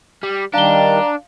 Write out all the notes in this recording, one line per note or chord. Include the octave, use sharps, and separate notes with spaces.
G3
D#3 G3 D4 F5 A#5 G7